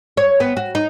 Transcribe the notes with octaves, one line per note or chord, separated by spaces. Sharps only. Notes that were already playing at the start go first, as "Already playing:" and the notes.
C#5
B3
F#4
D#4